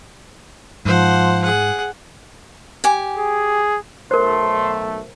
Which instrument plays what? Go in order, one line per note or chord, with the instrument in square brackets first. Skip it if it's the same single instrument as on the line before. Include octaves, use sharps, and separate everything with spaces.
[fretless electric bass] G#2 [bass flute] F3 [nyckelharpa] C5 F#5
[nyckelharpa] G#4 F#5
[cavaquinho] G4 G#5
[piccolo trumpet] G#4
[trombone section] B1 A3 [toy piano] A#4 C5 [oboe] C6